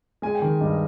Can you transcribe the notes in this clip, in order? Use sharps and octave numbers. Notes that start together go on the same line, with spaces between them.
G#3 G#5
G5
D#3
G2 D#5